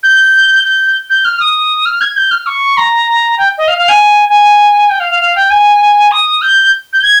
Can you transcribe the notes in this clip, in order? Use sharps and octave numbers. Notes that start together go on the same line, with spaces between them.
G6
G6
G6
F6
D#6
F6
G#6
G6
F6
C#6
A#5
G5
D#5
F5
F5
G#5
G#5
G5
F5
F5
F5
G5
G#5
D#6
G6
G6
G#6